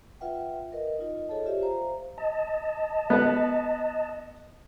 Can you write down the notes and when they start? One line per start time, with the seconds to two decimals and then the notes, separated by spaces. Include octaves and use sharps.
0.21 F4 B4 E5 F#5 G5
0.72 A#4 B4 D#5
0.98 D#4 F4 D#5
1.29 F4 G#4 A4 C#5 D#5 A5
1.46 F4 G4 C5 D5 E5
1.63 C5 F5 A#5
2.18 D#5 A5
3.10 B3 B4